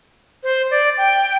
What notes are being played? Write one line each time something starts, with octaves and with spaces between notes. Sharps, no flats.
C5
D5
G5